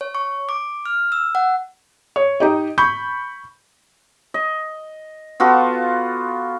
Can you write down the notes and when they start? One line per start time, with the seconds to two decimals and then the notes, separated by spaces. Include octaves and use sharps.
0.01 C#5
0.15 C#6
0.49 D6
0.86 F6
1.12 E6
1.35 F#5
2.16 C#5
2.40 D#4 G4 D#5
2.78 B5 C#6 G6
4.34 D#5
5.40 B3 F4 F#4 A4